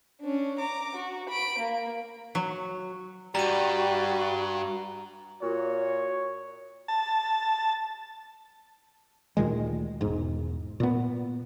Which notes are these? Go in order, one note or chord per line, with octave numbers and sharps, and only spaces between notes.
C#4 D4
A#5 D6
F#4
B5 D7
A#3
F#3
G2 G3 F#4 A#5 D#7
A#2 F#4 C#5
A5
D2 A#2 D#3 G#3
E1 G#2
A#2 B3